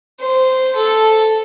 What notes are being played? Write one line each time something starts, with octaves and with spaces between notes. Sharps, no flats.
C5
A4